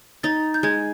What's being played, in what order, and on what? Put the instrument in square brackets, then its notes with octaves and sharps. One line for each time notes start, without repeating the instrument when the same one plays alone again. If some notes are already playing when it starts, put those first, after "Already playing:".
[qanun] D#4 [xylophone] A6
[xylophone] G6
[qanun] G#3 [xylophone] G#6